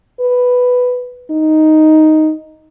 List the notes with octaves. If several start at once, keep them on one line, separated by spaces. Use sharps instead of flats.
B4
D#4